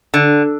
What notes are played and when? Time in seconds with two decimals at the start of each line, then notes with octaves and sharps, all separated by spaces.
0.14 D3